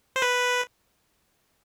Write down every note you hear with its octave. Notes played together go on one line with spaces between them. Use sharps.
C5
B4